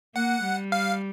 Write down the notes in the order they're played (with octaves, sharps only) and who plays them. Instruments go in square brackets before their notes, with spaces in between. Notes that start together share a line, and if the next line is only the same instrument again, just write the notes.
[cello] A#3 [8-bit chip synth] F#5
[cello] G3
[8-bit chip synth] F5